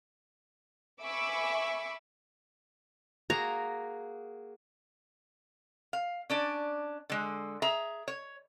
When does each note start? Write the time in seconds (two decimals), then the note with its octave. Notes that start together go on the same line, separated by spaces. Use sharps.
1.02 E5 G#5 B5 C#6 D6 E6
3.30 A#3 F#4 G#4 A#5
5.93 F5
6.30 C#4 D4 D5
7.10 D3 G#3
7.62 G#4 E5 A#5
8.08 C#5